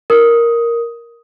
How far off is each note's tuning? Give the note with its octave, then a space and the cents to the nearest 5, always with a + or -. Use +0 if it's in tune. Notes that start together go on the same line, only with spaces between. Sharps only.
A#4 +0 D#6 +10